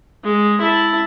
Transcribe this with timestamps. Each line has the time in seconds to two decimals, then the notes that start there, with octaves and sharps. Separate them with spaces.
0.24 G#3
0.61 E4 A5